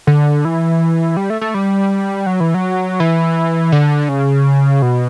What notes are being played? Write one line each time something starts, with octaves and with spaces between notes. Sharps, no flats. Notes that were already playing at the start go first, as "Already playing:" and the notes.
D3
E3
G3
A3
A3
G3
F#3
E3
F#3
E3
D3
C#3
B2